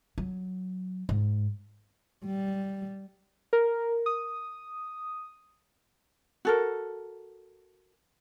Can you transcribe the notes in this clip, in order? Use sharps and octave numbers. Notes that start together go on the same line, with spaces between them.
F#3
G#2
G3
A#4
D#6
F#4 A4 A#4